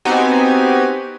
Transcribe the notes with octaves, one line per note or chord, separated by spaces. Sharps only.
B3 C4 D#4 F#4 G4 G#5